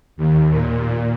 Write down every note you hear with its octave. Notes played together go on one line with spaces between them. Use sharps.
D#2
A#2